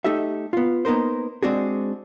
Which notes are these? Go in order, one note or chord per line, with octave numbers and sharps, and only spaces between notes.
A3 D#4 G4 A4 E5
B3 F4
A#3 B3 D#4 A#4 C5
G#3 C4 D4 F#4 G#4